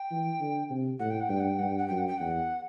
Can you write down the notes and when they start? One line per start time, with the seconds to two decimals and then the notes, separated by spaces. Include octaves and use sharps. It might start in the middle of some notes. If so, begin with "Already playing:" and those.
Already playing: G5
0.11 E3
0.40 D3
0.70 C3
0.99 A2 F#5
1.10 G5
1.20 F#5
1.29 G2 G5
1.40 F#5
1.49 G5
1.59 G2 F#5
1.69 G5
1.78 F#5
1.88 F#2 G5
1.98 F#5
2.08 G5
2.18 E2 F#5